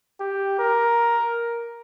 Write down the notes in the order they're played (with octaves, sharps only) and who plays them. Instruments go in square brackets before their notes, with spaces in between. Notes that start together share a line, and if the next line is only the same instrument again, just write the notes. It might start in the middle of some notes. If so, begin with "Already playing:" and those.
[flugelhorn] G4
A#4